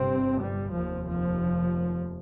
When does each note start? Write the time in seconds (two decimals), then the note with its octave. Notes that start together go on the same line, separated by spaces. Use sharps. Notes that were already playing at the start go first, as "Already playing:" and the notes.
Already playing: G1 G2 C3 C4
0.40 G2 G3
0.73 F1 D#2 F3
1.06 F3